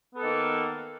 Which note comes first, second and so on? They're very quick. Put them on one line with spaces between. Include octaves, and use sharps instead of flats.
B3 A4 D#3 A#3